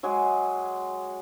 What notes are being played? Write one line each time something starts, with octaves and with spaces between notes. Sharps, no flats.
F#3 G#3 G#4